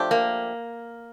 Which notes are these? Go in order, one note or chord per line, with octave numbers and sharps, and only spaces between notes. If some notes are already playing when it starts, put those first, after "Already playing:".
Already playing: F3 A3 D4 G4
A#3